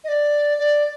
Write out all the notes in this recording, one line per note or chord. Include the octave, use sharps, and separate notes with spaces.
D#5
D5
D5